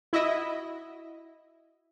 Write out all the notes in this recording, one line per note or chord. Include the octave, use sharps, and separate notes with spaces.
E4 F#4 D#5 E5